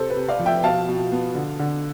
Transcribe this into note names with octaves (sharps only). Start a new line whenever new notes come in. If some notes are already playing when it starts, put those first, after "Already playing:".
Already playing: C3 A4 C5
B4
C3
D5 F5
F3
E5 G5
B2 F5 A5
B2
B3
D3
D3